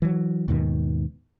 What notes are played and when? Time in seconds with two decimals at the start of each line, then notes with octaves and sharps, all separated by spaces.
0.02 E3 F#3
0.48 D#2 G#2 B2 D#3